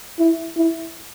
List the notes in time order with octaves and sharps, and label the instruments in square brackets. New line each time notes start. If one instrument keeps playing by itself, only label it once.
[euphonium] E4
E4